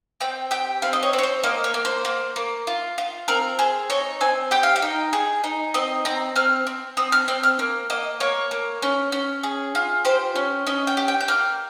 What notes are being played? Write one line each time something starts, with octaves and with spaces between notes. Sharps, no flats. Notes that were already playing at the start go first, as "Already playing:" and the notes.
C4 G5
G4 G5
C4 F5
D#5
C#5
C4
C#5
C5
A#3 D#5
C#5
A#3
C5
A#3
A#3
F4
F4
C4 A#4
G#4 C5
D#4 C#5
C4 G#5
G4 G5
F5
G5
D#4
G#4
D#4
C4 D#5
C4 A#5
C4 F6
C4
C4 D#6
F6
C4 G6
F6
A#3
A#3 D#5
A#3 C#5
A#3
C#4
C#4
G#4
F4
G4 C5
C#4
C#4 D#5
G5
G4
G5
G6
A#3 F6